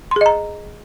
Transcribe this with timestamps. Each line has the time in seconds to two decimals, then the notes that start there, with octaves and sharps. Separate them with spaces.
0.11 C6
0.16 G#4
0.21 D#5
0.26 A#5